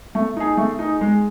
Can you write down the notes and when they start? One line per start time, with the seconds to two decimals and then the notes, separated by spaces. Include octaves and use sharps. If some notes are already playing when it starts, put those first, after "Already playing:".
0.15 A3
0.37 D#4 G#4
0.57 A3
0.79 D#4 G#4
1.01 G#3